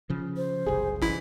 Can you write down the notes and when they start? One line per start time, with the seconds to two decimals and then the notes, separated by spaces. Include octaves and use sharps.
0.10 C#3 F3
0.37 C5
0.66 F#1 C2 G#4
1.02 A1 E4 B6